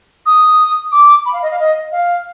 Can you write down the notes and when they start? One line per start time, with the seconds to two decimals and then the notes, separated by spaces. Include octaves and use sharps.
0.26 D#6
0.92 D6
1.25 B5
1.33 F5
1.42 D#5
1.51 F5
1.59 D#5
1.92 F5